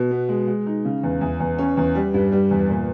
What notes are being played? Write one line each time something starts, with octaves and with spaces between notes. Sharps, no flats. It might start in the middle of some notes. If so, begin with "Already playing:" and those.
Already playing: B2
B3
G#3
G#3
D#4
C#3
E2
E2
E2
C#4
E2
G3
G2
G3
E2
A#2